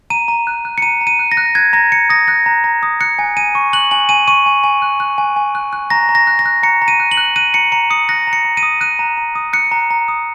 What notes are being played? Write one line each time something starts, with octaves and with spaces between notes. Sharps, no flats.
A#5 D#7
A#5
F#6
F#6
C#7
A#5 D#7
A#5
D#7
F#6
A#6
F#6
F#6 G#6
A#5 A#6
A#5 C#7
D#6 A#6
F#6 A#6
A#5
A#5
D#6
F#6 C#7
G#5
G#5 D#7
C#6
F#6 F#7
G#5 F#7
G#5 D#7
C#6 D#7
G#5
G#5
F#6
F#6
G#5
G#5
F#6
F#6
A#5 A#6
A#5
A#6
F#6
A#6
F#6
A#5 C#7
A#5
D#7
F#6
F#7
F#6
F#6 D#7
A#5 C#7
A#5 C#7
D#6 C#7
F#6 A#6
A#5
C#7
A#5
D#7
D#6
F#6 D#7
A#5
A#5
D#6
F#6 C#7
A#5
A#5
D#6